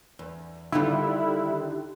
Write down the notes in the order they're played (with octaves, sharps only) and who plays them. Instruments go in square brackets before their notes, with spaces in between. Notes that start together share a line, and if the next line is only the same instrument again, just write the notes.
[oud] E2
[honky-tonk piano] D3 D#3 [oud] G3 B3 F4 [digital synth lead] E4 [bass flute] G4